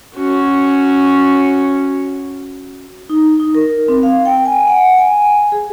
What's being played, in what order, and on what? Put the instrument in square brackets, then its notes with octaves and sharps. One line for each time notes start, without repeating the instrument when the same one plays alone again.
[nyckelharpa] C#4 F#4
[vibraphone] D#4
D#4
A#4
C4
F5
G5
G#5
F#5
G#5
G#4